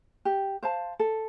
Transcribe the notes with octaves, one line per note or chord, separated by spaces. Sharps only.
G4
C5 F5 A5
A4